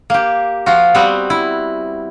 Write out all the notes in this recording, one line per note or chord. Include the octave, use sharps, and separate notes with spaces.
A#3 G4
F3 F4 F#4
G3 B3 C4 F#4 F#5
E4